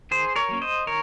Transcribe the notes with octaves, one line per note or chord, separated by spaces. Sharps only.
D#3 G#4 C5
A#4 C#5
F#3 A#3 C#4
C5 D#5
D#3 A#4 C#5